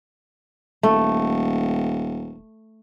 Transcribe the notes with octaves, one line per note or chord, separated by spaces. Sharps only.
D#1 A3